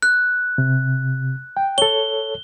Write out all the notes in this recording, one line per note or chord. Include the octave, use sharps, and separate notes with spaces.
F#6
C3
G5
A4 C#5 G7